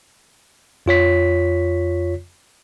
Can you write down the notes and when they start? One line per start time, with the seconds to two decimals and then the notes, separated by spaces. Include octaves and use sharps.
0.86 F2 F4 C#5 B6